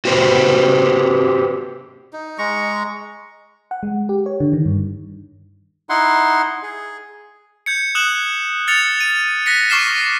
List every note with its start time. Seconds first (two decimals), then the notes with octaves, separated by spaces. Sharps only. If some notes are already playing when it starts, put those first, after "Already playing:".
0.05 F#4 G4 B4 C5
2.13 D#4
2.38 G#3 A#5 C#6
3.71 F#5
3.83 G#3
4.09 G4
4.26 C#5
4.40 D3
4.53 D#3
4.66 G2
5.89 D#4 E4 F#5 C6
6.63 G#4
7.66 G6 G#6 C#7
7.95 D#6 F#6 E7 F#7
8.67 F6 A6 C#7 F7
9.00 D#7
9.46 F#6 A#6 B6 C#7
9.70 C#6 D6 F6 C7 E7